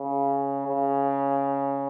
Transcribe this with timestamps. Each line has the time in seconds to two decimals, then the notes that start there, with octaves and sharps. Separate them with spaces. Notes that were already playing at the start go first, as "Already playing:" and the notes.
Already playing: C#3
0.67 C#3